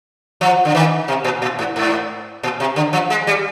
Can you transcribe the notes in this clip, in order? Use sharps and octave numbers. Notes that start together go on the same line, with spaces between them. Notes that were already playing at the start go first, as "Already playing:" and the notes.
F3
D3
D#3
C3
A#2
A#2
G#2
G#2
A#2
C3
D3
F3
G#3
G3